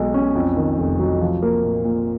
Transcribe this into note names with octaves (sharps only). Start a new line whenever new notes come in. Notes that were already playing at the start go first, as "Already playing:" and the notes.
Already playing: B1 B2 G#3
C#4
F2
D#3
F1
F#3
F3
A#3
A#2
A#2